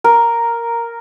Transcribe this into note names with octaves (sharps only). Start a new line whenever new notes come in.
A#4